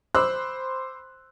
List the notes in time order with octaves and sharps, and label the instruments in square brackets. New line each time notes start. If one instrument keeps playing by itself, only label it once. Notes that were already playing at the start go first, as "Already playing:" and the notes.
[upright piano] C5 B5 D6 E6 F#6